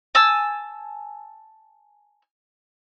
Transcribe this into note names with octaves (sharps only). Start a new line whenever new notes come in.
G#5 A5 E6